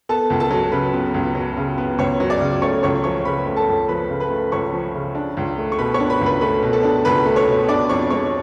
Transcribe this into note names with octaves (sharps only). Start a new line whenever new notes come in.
B3 A4 A5
C#2
A4 A5
F#3
C#3 B4 B5
B3
C#2
F#3
C#3
B3
C#2 C#5 C#6
F#3
D5 D6
C#3
A3 C#5 C#6
C#2 C#5 C#6
F3 C#5 C#6
C#3 B4 B5
A3
A4 A5
C#2
F3 B4 B5
C#3
B4 B5
A3
C#2 C#5 C#6
F3
C#3
D4
C#2
A3
C#6
B2 B4 B5
C#5 C#6
D4
B4 B5
C#2
B4 B5
A3 B4 B5
B2
A4 A5
D4
C#2 B4 B5
A3
C#5 C#6
B2
D4 D5 D6
F2 C#5 C#6
G#3 C#5 C#6